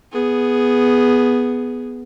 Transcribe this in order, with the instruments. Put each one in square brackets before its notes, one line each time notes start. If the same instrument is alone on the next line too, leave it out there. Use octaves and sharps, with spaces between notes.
[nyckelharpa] B3 G#4